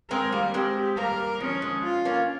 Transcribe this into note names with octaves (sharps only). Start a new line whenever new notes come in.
G#3 C4 A#4
G3 A#3
G#3 C4 G4
G3 A#3 A#4
F3 G#3 C#4
F3 G#3
F4
A#3 C#4